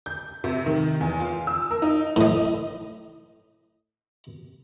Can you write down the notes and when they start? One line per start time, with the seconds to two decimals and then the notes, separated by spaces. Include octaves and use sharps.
0.06 G6
0.44 C3
0.66 D#3
1.01 E2
1.20 F4
1.47 E6
1.71 A#4
1.82 D#4
2.16 A2 D#5